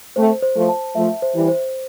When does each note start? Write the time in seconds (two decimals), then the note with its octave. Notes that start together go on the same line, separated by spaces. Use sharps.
0.16 A3 C4 C5
0.42 C5
0.55 F3 A3
0.69 A5
0.95 F3 A3 E5
1.22 C5
1.34 E3 G3
1.48 C5